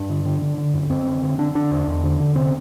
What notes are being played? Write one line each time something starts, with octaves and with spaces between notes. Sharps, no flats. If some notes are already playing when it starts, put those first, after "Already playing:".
Already playing: G2 D4
D3
D3
D3
D3
F#2
F#2 C4
D3
D3
D3 D4
D3 D4
E2
E2
D3
D3
C3 C4